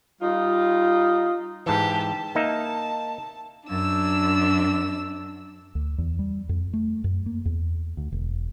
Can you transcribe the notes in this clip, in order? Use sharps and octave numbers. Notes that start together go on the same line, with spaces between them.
G3 D#4 F4
G#2 E3 G4 A5
A5
A#3 D#4 E5
F#2 D4 E6
D2
E2
G3
F2
A3
F#2
A#3
E2
D2
E1